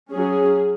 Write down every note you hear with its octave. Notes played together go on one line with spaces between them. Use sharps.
F#3 C#4 G#4